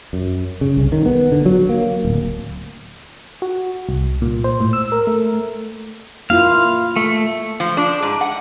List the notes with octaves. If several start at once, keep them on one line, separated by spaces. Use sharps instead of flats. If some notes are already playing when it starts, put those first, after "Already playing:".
F#2
C#3
C2
D#3
B3
D3
F#3
A#3
D1
F#4
C2
A#2
C5
A2
E6
A#4
A3
A#3 E4 F4 F5
A3
F3
D4
G#2
F#5